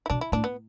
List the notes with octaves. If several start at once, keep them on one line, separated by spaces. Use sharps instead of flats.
E4
B2 D4
E4
A2 D4
B3